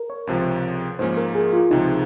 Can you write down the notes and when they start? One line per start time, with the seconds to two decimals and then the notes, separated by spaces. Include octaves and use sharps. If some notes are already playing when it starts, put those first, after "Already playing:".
Already playing: A#4
0.10 C#5
0.27 C#2 C3 F3
0.99 G#2 F3 A#3 C#4 C5
1.17 A#4
1.35 G#4
1.53 F4
1.71 C#2 C3 F3 D#4